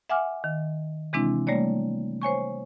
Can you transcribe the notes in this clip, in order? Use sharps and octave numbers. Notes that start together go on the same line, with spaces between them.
E5 F#5 G#5 D6 F6
D#3
C3 E3 G#3 C4 D4 E4
G3 A3 A#3 C#5 D5
C5 C#5 G#5 C#6